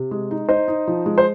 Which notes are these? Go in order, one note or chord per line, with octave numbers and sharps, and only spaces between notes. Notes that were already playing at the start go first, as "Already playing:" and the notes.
Already playing: C3
G#3
D#4
D#4 C5 D#5
D#4
F3
G#3
C5